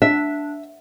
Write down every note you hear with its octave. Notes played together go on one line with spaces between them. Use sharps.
D4 E5